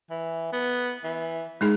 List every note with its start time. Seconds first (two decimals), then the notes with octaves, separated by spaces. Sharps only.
0.10 E3
0.53 B3
1.04 E3
1.61 G#3 D#4 E4 G#4